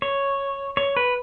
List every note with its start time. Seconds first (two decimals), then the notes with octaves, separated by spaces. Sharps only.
0.02 C#5
0.77 C#5
0.97 B4